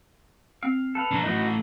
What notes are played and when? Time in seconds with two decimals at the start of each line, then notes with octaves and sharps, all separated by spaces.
0.63 C4 F5
0.95 A4 B4 F5
1.11 D4 A#4
1.24 D1 E3 A3 D#4 F#4